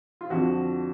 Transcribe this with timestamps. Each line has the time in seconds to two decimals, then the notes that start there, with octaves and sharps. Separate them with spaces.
0.21 F4
0.30 F2 D3 F3 F#4